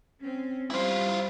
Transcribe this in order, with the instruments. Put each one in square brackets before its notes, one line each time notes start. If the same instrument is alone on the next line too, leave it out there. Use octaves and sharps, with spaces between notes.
[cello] C4 C#4
[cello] G3 C5 [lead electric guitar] E4 F4